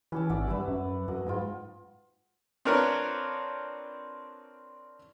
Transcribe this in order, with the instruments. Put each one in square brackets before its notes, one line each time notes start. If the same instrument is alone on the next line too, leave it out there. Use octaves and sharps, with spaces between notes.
[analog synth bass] E3 [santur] C#4 G4 A5
[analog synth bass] G#1 [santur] D5 E5 F#5
[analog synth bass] G2 [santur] B4 E5 F#5
[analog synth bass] F#2
[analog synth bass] F#2 [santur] F#4 D#5
[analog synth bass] G#2 [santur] F4 G5 G#5
[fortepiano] C4 D4 F4 A#4 B4 C#5